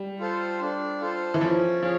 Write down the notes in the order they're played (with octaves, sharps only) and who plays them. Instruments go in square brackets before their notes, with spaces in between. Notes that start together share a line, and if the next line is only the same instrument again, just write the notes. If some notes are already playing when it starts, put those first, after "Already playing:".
Already playing: [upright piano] G3
[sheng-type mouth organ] F4 A4 C5
D4
F4 A4 C5
[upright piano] E3
[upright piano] F3 [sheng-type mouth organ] C#4
[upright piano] F3 [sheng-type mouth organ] G#4 C#5 F5